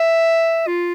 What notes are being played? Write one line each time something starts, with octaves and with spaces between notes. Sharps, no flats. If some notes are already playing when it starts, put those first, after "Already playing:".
Already playing: E5
F4